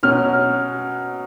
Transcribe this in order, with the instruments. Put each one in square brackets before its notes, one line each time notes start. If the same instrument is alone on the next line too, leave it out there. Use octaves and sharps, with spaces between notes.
[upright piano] B2 F#3 C#4 F6